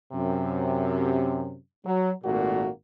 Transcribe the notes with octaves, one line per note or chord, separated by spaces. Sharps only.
F#2 C3
F#3
G#1 A#2 A3 A#3 F#4